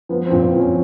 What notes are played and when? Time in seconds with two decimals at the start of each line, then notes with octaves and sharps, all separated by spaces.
0.09 F3 B3
0.27 A#2 C4
0.43 C4
0.55 F3 C#4